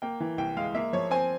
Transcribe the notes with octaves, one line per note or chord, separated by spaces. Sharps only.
A#3 G5
E3
C2 G5
G#3 F5
A#3 E5
F3 C#5
C4 G#5